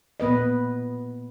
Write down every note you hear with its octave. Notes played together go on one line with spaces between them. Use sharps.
A#2 B3 B4 D#5